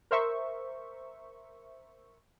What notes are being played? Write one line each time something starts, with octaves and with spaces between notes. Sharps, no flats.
A#4 C5 E5 C#6